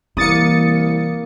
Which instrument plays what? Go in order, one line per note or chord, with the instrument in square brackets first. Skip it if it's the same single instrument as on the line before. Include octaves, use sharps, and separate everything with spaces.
[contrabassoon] C2 [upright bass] E3 [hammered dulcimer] A#3 D6 [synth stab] D#6 A6 C#7